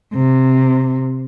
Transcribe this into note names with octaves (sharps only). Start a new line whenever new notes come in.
C3